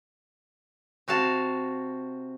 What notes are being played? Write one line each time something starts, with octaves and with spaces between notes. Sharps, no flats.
C3 F#4 F5 A5